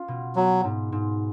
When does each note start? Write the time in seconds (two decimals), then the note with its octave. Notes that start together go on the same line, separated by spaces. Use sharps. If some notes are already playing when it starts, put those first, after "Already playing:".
Already playing: C#4 F4
0.08 B2
0.36 F#3 B3
0.64 G#2
0.92 G#2